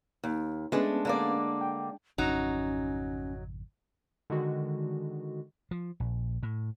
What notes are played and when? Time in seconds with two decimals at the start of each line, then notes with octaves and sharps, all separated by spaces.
0.24 D#2
0.72 G#3 A3 B3 C#4 D4 B4
1.05 D3 A#3 D5
1.61 G5
2.18 G#1 F2 C#3 F#3 C#4 D#4
4.30 D3 D#3 G#3 F#4
5.71 F3
6.00 A#1
6.43 A2